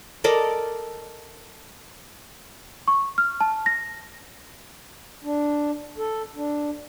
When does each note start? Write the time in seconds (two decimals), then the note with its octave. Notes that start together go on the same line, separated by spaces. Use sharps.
0.24 A4 A#4 D5 D#5
2.88 C#6
3.18 F6
3.40 A5
3.66 A#6
5.24 D4
5.98 A4
6.36 D4